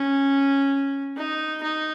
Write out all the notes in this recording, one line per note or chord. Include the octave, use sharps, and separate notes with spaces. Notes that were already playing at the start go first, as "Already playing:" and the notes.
Already playing: C#4
D#4
D#4